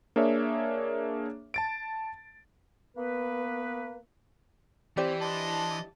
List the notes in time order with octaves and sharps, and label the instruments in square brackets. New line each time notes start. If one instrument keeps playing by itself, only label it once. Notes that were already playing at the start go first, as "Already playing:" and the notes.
[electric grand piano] A#3 D4 G#4 C#5 E5
A5 A6 D7
[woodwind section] A#3 B3 B4
[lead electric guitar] E3 [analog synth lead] C4 [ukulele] E4 G4 D5
[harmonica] D4 C5 D#5 [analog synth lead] A5